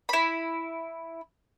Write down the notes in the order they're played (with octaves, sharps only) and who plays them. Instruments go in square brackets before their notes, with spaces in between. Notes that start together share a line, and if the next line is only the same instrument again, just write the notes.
[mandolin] E4 B5